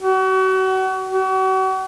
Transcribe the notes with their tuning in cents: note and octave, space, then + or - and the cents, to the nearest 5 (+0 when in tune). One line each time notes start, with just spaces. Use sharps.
F#4 +35
F#4 +40